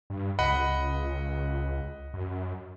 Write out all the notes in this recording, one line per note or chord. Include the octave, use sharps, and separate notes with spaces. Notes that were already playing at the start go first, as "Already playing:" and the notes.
G2
C#2 D#5 F#5 B5
F#2